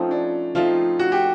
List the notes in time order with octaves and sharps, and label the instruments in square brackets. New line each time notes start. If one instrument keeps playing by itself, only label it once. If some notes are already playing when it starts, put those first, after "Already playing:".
Already playing: [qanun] F3 A3 C4 D#4 [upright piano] C#4
[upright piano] D4
[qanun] F3 A3 C4 D#4 [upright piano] F4
[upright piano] F#4
G4